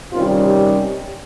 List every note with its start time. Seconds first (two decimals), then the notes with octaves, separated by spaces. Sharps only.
0.12 C3 D#3 G3 C#4 F4
0.45 G4